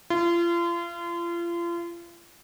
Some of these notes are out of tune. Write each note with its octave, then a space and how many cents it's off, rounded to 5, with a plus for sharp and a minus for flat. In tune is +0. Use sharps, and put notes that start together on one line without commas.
F4 -35